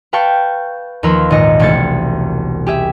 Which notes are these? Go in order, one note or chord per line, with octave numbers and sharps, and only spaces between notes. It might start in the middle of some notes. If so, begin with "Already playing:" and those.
B4 F5 G5 A5 C#6 G6
D#2 F3 A#4 B4 C6 E6
G#1 A#2 D#5 C#7
E1 C2 A3 G#6 A6 C#7
G4 G#4 E5